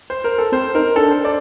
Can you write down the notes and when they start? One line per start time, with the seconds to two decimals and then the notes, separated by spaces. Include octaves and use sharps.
0.10 C5
0.24 A#4
0.38 A4
0.52 C4 C5
0.75 D#4 A#4
0.96 D4 A4
1.10 C5
1.25 D5